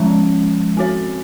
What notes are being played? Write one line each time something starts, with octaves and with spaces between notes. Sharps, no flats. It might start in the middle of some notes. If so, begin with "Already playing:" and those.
Already playing: F3 G#3 C#4
C4 F#4 C#5